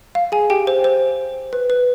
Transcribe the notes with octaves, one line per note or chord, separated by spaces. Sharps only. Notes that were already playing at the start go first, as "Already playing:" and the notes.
F5
G#4 G#5
G4 G5
C5
C5
B4
B4